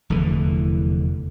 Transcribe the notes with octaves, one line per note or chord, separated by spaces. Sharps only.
F1 E2 D3 E3